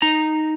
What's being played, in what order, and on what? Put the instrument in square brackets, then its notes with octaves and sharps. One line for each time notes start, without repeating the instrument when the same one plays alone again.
[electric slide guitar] D#4 A#5